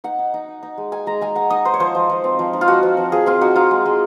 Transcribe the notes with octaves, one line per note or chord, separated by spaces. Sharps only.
D#4 F#5
D#4
D#4
D#4
D#4
G#3
D#4 G#5
G#3 A#5
G#3 G#5
D#4 F#5
D#4 D#5
D#4 C5
C#5
F3 C5
F3
F3
C4
F3
D#4
F4
F3 F#4
C4
F3
F3 G#4
C4 F4
D#4 F#4
D#4 F4
G#3
G#3